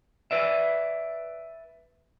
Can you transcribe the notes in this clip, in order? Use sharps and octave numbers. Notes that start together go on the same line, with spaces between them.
B4 D5 E5